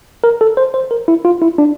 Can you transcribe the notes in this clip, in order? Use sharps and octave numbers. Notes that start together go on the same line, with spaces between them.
A#4
A4
C5
C5
A#4
E4
F4
E4
D4